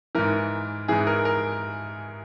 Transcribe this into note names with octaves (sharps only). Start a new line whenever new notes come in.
G#2 E3 A#4
G#2 E3 G#4
A#4
A#4